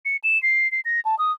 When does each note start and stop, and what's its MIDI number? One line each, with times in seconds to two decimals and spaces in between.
0.05 0.17 97
0.24 0.41 100
0.43 0.70 96
0.72 0.80 96
0.85 1.00 94
1.05 1.18 81
1.19 1.32 87